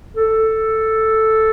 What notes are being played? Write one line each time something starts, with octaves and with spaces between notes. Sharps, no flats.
A4